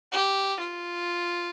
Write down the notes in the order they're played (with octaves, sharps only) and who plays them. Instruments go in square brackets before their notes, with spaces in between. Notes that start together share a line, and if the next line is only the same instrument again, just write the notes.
[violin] G4
F4